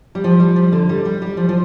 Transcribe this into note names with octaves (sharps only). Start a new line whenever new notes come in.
G3
F3
G3
F3
D3
G3
G3
G3
F3
F3